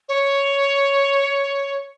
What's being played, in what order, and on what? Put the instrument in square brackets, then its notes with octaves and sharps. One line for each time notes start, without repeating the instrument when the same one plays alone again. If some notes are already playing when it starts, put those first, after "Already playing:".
[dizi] C#5